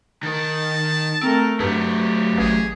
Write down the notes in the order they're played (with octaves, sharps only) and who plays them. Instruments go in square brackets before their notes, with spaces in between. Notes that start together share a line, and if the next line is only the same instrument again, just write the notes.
[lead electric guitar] D#3 A#4 [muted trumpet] A5
[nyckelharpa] A3 A#4 [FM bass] C4
[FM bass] G2 [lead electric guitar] F#3 A3 [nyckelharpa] G4
[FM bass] A1 [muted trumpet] G#4